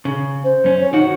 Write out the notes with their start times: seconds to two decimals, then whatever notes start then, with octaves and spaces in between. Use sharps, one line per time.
0.05 C#3
0.44 C5
0.64 F#2 C#4
0.80 C#5
0.93 D#3 D#4 F#4